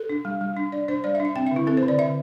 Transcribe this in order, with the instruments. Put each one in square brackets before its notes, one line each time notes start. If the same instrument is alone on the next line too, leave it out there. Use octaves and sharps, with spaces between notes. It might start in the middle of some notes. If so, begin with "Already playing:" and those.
Already playing: [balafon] A4
D4
G3
G3
D4
D4 D5
D4 C5
G3 D5
E5
D4
E5
C4 G5
E5
D3
E4
C4 A4
C5
D3
D5
D3 E5